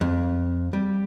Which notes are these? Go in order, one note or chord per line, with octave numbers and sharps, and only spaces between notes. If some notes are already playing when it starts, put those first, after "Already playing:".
F2
G3